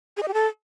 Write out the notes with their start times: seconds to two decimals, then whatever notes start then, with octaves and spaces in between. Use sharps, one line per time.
0.17 G#4
0.23 D#5
0.28 G4
0.34 A4